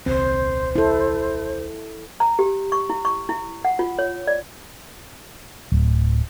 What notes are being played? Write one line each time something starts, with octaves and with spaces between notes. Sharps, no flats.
D#1 C2 C4 C5
E4 A4
A#5
G4
C#6
E4
C#6
E4
F#5
F4
C#5
D5
D1